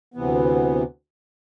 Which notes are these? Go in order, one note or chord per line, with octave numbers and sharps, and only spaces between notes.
D2 C3 E3 B3